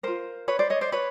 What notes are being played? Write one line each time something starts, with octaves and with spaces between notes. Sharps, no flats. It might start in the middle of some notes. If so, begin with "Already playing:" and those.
F4 A#4 C5
B4 C#5
C5 D5
C#5 D#5
C5 D5
B4 C#5